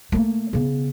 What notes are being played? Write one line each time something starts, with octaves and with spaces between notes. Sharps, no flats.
A3 A#3
C#3 B3